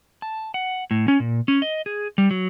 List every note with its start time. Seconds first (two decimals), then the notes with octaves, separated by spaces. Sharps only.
0.22 A5
0.54 F#5
0.91 A2
1.08 C#4
1.20 A#2
1.48 C#4
1.62 D#5
1.86 G#4
2.18 G3
2.31 F#3